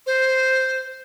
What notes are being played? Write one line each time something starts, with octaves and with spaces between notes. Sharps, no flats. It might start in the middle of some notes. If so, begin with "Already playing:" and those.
C5